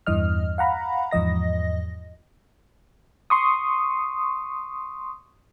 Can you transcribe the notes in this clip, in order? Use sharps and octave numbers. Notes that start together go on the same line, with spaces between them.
E2 G2 E3 D#5 F6
F5 F#5 A#5 B5
E2 G#2 F3 D#5 A#6
C6 C#6 D#6